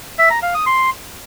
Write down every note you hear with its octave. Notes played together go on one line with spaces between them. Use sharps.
E5
A#5
F5
D#6
C6